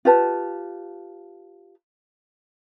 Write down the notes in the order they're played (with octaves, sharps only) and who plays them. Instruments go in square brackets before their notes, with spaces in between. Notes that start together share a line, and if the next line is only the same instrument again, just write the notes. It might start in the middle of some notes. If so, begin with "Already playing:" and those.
[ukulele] F4 G4 B4 A5